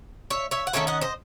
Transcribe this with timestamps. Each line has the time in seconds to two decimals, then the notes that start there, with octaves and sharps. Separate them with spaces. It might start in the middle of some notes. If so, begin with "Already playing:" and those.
0.30 C#5 E5
0.51 C#5 E5
0.67 F#5
0.73 D#3 F#3 A3 C#4 C#5 E5
0.87 D#5 F#5
1.01 C5 D#5